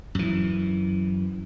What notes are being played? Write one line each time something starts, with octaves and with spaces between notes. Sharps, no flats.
F#2 E3